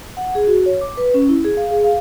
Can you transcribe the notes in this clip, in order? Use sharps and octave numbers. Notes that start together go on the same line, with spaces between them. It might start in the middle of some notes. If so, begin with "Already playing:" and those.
F#5
G#4
F#4
C#5
D6
B4
C#4
E4
G#4
F5
G#4
F5